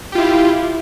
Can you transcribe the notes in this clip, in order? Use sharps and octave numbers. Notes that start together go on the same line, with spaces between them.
E4 F4 G4